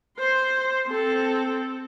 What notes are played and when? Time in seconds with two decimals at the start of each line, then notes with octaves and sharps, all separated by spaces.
0.19 C5 C6
0.88 C4 A4